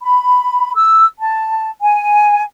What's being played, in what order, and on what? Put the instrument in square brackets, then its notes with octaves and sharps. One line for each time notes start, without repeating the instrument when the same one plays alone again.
[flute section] B5
E6
A5
G#5